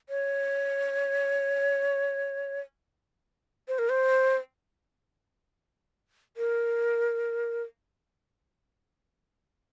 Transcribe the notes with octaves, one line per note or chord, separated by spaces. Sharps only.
C#5
C5
A#4
C5
A#4